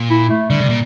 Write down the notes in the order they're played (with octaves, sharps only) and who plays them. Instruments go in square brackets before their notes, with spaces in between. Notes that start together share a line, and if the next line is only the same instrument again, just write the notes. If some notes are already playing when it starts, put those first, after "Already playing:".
Already playing: [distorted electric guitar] A#2
[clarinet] E4
A3
[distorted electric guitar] D3 [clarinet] G3
[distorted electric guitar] C3
A#2